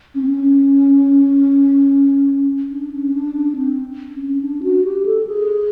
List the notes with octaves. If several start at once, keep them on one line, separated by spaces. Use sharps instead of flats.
C#4
C4
C#4
D4
C#4
D4
D4
C4
C#4
D4
F#4
G4
A4
G#4